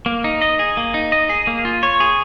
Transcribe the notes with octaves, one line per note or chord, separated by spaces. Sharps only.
A#3
D#4
D#5
G#4
A#3
D#4
D#5
G#4
A#3
F4
C#5
G#4